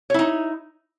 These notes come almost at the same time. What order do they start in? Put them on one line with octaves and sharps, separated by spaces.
C#5 E4 D#4